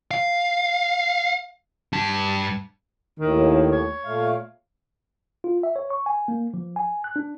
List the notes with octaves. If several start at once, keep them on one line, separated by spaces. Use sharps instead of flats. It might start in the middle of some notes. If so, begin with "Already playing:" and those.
F5
G2 A5
D#2 A2 D#3
C#5
A#2 A3 F5
F4
E5
C#5
C#6
G#5
A#3
F3
G#5
F#6
D4